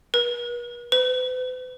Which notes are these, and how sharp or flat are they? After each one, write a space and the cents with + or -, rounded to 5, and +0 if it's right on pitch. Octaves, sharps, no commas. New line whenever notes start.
B4 -45
B4 +45